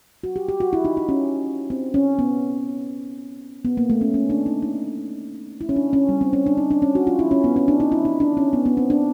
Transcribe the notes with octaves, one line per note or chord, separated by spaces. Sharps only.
F#4
G4
G4
F#4
E4
D#4
D#4
C#4
C4
C#4
B3
B3
A#3
A3
C#4
C#4
D4
D#4
D#4
E4
C#4
D4
C#4
G3
C4
C#4
D4
D#4
D4
C#4
F#4
F4
E4
C#4
B3
C#4
D4
D#4
E4
D#4
D4
C#4
B3
B3
C4
D4